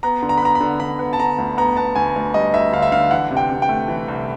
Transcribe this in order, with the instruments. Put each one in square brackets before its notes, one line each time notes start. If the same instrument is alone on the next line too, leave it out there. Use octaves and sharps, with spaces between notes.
[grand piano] B3 A#5
D3
A#5
B5
B3 A#5
B5
D3
D3 B5
B3
A5
D3 A#5
D2
B3 A#5
B3 A5
D2 G#5
D2
G3 D#5
D2 E5
D3 F5
E5
D3 F5
E3 F#5
C3
G5
C3
G5
A3
E3
C2